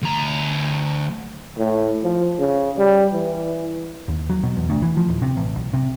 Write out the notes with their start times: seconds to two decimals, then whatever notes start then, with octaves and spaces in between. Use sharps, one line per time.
0.02 D2 A#5
1.58 A2
2.04 F3
2.39 C#3
2.78 G3
3.13 E3
4.08 D#2
4.30 F#3
4.43 B2
4.57 E2
4.70 D2
4.82 E3
4.97 F3
5.08 D#1
5.22 C3
5.37 A1
5.56 B1
5.73 C3